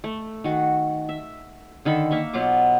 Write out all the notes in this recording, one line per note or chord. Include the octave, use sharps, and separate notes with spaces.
A3
D#3 F#4
E5
D3 D#3 A4 B5
A#3 E5 C#6
B2 F#3 F4 D6